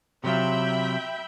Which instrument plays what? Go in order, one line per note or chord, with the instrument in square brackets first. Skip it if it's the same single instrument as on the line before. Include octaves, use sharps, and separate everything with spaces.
[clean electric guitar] C3 F#3 F4 [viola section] E5 G5 B5